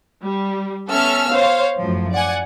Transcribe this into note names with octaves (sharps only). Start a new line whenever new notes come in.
G3
B3 C#4 A4 E5 E6 F6
C5 C#5 F5
F#2 A2 F3
D5 F#5 G#5